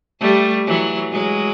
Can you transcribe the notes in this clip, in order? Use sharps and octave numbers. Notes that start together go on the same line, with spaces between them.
G3 A3
E3 F#3
F#3 G#3